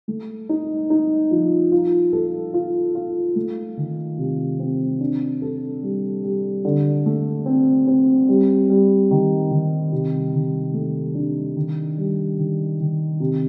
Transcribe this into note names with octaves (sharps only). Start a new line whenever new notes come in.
A3
D#4
D#4
F3
F4
A4
F4
F4
A3
D#3
C3
C4
D4
A4
G3
G3
D3
A3
C4
C4
G3
G3
D#3
D#3
C3
D#3
A3
D4
D#3
G3
D#3
D#3
C3